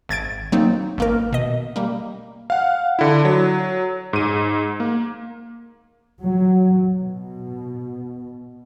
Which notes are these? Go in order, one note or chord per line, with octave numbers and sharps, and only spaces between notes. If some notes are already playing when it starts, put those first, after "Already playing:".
G#1 G#6 A6 D7
F#3 A#3 C4 D#4
G#1 A#3 A#4
B2 D#5
G3 A#3
F5 F#5
D3 E4
F#3
G#2 D#7
A#3
F#3
B2